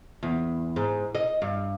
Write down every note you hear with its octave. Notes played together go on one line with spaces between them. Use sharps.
E2
G#2
D#5
G2